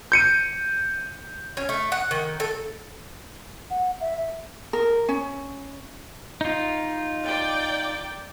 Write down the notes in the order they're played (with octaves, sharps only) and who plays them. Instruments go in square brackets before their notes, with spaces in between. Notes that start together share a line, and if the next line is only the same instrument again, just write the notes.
[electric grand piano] G6 C#7 D#7
[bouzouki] C#4
A3
F#5
D#3
A4
[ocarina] F#5
E5
[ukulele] A#4
C#4
[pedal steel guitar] D#4 F4
[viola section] D5 G5